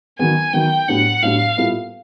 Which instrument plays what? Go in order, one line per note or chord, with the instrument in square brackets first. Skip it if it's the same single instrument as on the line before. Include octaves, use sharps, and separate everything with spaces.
[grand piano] D#3 F#3 B3 [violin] G#5
[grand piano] D#3 F#3 B3 [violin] G5
[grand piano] A2 F#3 B3 D4 G4 [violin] F#5
[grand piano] A2 F#3 B3 D4 G4 [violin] F5
[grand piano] A#2 G3 B3 E4 A4